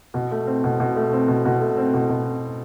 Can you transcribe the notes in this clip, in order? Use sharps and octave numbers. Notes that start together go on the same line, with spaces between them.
B2
A3
C4
B2
B2
A3
C4
B2
B2
A3
C4
B2
B2